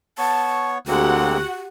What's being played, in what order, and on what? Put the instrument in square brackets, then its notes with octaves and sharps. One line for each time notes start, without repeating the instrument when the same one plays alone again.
[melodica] B3 C#5 C#6 [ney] A5
[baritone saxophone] D2 [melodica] G#3 A#3 C4 [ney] F#4 [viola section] G4 F#5